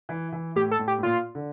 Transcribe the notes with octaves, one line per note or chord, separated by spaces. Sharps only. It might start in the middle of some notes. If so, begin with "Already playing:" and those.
E3
E3
A2 G4
A4
A2
G4
A2
A#2 F4
D3